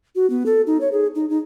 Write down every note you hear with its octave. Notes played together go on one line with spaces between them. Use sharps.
F#4
B3
A4
D#4
C#5
G#4
D#4
D#4